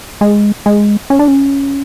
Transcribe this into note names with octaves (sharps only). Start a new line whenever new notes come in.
G#3
G#3
C#4
D4
C#4